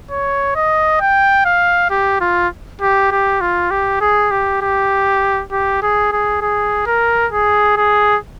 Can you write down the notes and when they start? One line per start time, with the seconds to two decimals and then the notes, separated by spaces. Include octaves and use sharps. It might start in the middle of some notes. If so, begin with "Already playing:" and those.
0.11 C#5
0.56 D#5
1.01 G5
1.45 F5
1.90 G4
2.21 F4
2.81 G4
3.12 G4
3.41 F4
3.71 G4
4.01 G#4
4.31 G4
4.62 G4
5.52 G4
5.82 G#4
6.12 G#4
6.42 G#4
6.87 A#4
7.32 G#4
7.77 G#4